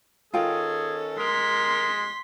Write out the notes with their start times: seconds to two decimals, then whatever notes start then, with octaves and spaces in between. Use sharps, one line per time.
0.34 D#3 C#4 F4 G#4 A4 G5
1.19 G#3 A#4 C6 B6